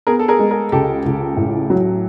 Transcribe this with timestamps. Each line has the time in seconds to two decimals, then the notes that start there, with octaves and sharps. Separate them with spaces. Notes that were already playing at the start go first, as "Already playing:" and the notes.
0.07 B3 G#4 A#4
0.19 A4
0.28 G#4 A#4
0.39 G#3
0.51 G#4 A#4
0.72 C#2 G4 A4
1.05 C#2
1.37 A1
1.70 F#3